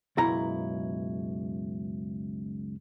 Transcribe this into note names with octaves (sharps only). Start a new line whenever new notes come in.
C#2 F#2 B2 E4 A#5